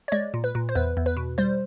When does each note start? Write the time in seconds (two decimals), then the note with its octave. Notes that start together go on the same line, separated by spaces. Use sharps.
0.08 C#5
0.12 G#3 D5
0.34 A#2
0.44 B4
0.55 A#2
0.69 C5
0.75 E2 B4
0.97 E2
1.06 B4
1.17 B2
1.38 G3 C5